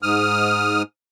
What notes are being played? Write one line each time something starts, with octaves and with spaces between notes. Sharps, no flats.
G#2 D#6 F6